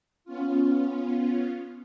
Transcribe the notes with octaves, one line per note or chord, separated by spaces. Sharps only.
B3 C#4 F4